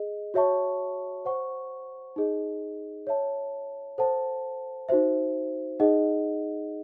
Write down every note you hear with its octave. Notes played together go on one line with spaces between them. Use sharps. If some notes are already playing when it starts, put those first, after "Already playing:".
Already playing: G#4 D#5
F#4 C#5 E5 A5 C#6
C5 F#5 C#6
D#4 G#4 D#5
C#5 E5 A5
A4 C5 F#5 A5
D#4 F#4 C5 E5
D#4 G#4 D#5 F#5